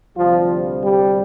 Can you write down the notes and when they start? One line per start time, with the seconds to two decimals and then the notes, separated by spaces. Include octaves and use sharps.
0.17 D2 C3 F3 G3 F4
0.83 G3